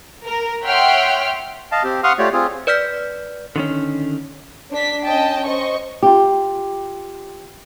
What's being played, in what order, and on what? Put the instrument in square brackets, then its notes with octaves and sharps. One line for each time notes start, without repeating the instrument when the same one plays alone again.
[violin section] A#4
C#5 E5 F#5 G5 C6 F6
[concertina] D#5 F5 A5
C4 G4
F5 F#5 C6 C#6 D#6 F6
A3 F4 G4 C#5 D5
C4 F4 G#4
[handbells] B4 D5 F6 G6 B6
[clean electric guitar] D3 D#3 C#4
[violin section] D4 B6
C#4 D#5 G5 A5
C5 D#5 C#6
[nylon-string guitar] F4 G4